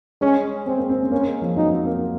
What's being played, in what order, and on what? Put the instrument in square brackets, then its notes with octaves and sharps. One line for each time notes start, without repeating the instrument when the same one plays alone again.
[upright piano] G#3 [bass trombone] C#4
[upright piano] G#3 [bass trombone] C4
[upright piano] A#3
C4
C#4
[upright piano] A#3 [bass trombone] C#4
[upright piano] G#3
F3
[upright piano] F#3 [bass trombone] D#4
[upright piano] C4
A#3